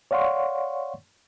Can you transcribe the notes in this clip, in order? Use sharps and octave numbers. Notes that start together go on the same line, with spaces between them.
C#5 D5 F5 F#5 C6 C#6